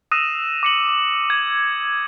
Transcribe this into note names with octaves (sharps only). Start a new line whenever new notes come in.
D#6 E6 F#6 A#6 D#7 E7
D6 C#7 F#7
G#6